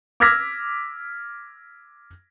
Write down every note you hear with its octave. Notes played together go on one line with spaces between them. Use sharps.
D6 E6 F6 G#6 A#6 B6